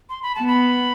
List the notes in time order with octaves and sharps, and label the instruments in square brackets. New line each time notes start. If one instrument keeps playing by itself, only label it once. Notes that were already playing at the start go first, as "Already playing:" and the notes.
[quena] C6
B5
A5
[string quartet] B3
[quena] B5